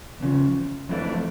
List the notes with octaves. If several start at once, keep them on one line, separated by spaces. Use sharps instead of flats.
E2 C#3 F3
F2 E3 A3 D4